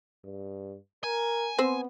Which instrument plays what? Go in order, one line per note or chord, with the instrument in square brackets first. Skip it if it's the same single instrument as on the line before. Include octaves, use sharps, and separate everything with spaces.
[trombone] G2
[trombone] A#4 [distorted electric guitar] G#5
[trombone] B3 [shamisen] C4 C5